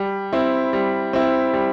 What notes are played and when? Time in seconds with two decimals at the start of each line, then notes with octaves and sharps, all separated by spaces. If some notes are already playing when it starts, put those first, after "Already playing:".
Already playing: G3
0.33 C4 E4
0.73 G3
1.13 C4 E4
1.53 G3